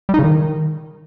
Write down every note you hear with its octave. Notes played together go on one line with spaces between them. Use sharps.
G3
D#4
C#3
D#3